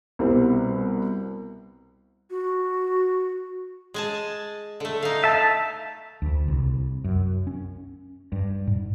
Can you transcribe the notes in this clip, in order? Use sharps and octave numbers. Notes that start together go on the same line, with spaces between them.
C2 B2 G3 C4
F#4
G#3 G#5 A5
D3 A3
D#4 F5
E5 A5
D2
C2
F#2
C#4
G2
G#2